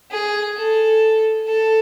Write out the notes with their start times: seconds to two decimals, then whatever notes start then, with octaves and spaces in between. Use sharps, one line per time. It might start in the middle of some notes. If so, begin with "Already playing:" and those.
0.11 G#4
0.57 A4
1.47 A4